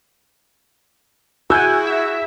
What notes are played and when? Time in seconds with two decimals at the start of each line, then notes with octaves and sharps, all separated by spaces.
1.50 E4 F#4 G#4 G#5 E6 F#6 G6
1.87 F#4 E5